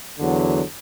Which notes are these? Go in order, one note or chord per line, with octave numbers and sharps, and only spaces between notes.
E2 D3 F#3